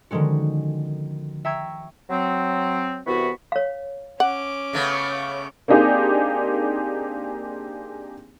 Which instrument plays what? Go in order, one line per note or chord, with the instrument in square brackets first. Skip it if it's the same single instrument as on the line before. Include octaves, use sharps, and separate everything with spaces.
[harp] D3 D#3 F3 G#3 C#4 F#4
E5 G5 A#5 C#6 E6 G#6
[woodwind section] F#3 C4
C2 E3 B3 F#4 B5 C#6
[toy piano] C#5 F5
[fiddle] C#4 D6 [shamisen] F#5
[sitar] C#3 A3 B3
[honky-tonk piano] A#3 C4 D4 D#4 G4 G#4